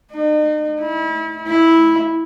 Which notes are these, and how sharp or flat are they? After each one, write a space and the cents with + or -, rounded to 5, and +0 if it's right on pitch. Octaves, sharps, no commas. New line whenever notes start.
D#4 -40
E4 -35
E4 -10